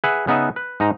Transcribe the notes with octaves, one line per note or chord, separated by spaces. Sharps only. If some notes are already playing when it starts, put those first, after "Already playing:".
G#4 B4 E5 F#5
C#3 B3 D#4 B4 E5
B4
G#2 D#4 D#5 A#5